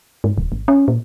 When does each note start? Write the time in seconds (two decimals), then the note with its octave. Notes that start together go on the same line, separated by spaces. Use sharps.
0.24 G#2
0.38 D1
0.52 G#1
0.68 C#4
0.88 A#2